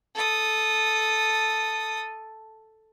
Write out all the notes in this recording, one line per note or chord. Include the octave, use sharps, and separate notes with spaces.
A4 D#6